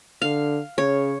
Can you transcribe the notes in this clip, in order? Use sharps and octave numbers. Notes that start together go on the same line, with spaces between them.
D3 F5
C#3 C#5